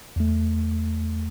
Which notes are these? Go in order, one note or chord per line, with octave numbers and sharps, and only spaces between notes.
E2 A3